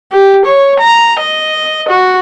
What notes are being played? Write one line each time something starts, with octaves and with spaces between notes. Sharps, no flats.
G4
C#5
A#5
D#5
F#4